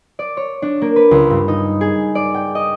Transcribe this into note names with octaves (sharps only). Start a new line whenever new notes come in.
D5
C#5
D4
A#3
B4
C#2
G2
D#4
G#4
D5
G5
D#5